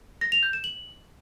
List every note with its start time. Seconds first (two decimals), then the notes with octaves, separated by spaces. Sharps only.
0.21 A#6
0.32 F7
0.43 G6
0.53 E7
0.64 F#7